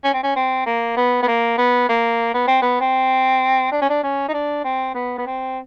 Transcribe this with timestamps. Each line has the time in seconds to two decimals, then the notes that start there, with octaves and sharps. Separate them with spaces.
0.04 C#4
0.14 C4
0.23 C#4
0.36 C4
0.66 A#3
0.96 B3
1.23 B3
1.28 A#3
1.58 B3
1.89 A#3
2.35 B3
2.48 C4
2.62 B3
2.81 C4
3.72 D4
3.82 C#4
3.90 D4
4.04 C#4
4.29 D#4
4.34 D4
4.64 C4
4.95 B3
5.18 B3
5.27 C4